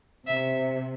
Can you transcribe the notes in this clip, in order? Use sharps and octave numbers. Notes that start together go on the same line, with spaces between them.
C3 E5